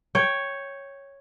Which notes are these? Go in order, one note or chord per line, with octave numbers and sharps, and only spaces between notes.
C#5 G5